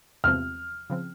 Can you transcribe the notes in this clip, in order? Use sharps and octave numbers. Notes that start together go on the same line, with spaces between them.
E2 C3 F3 C4 F6
C#3 F3 C4